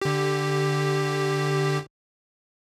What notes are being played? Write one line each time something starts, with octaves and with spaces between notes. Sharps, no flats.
D3 G4